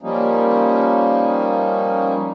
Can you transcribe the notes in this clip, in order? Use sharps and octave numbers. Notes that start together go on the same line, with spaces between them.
F3 G3 A#3 C#4 D#4